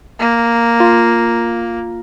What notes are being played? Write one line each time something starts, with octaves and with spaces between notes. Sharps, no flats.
A#3
F4